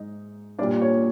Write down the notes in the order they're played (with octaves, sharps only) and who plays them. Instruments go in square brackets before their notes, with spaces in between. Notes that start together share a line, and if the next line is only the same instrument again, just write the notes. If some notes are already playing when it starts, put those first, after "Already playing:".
Already playing: [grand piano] G#2 D#4
A#2 G3 A#3 D4 D5
C#5